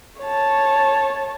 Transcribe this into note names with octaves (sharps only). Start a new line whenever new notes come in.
C#5 A5